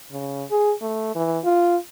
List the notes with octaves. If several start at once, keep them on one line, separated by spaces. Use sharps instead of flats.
C#3
G#4
A3
E3
F4